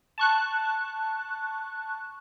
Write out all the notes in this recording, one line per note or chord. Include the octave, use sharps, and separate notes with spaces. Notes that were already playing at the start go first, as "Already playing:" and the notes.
A5 C#6 F#6